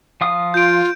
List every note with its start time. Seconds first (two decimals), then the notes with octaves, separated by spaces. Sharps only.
0.21 F3 F5 D#6
0.54 F4 G6 D7